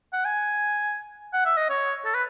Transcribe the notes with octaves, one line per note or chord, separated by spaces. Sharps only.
F#5
G#5
F#5
E5
D#5
C#5
A4
B4